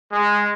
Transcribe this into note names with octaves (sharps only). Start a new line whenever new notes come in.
G#3